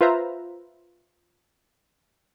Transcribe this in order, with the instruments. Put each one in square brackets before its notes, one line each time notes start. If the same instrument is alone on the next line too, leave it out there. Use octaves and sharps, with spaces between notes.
[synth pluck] F4 B4 C5 E5 A#5